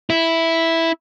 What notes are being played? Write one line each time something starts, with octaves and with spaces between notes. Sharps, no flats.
E4